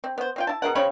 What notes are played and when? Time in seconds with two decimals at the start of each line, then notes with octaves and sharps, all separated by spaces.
0.04 C4
0.18 B3 C5
0.36 C4 F4 G5
0.47 E4 A5
0.62 B2 G#4 A#4 F#5
0.75 C#3 C4 C#5 B5